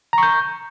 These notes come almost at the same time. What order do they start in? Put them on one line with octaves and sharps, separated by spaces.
A#5 C#6 G6